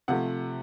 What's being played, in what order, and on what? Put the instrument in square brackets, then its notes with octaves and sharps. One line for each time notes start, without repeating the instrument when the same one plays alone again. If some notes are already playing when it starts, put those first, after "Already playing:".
[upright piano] C3 F3 A3 F#5